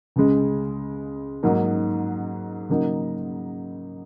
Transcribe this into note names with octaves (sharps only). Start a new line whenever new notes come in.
C#2 C#3 G#3
G#2 F#3 A#3 D#4
C#3 F#3 A#3 D#4